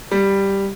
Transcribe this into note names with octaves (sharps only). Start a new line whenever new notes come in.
G3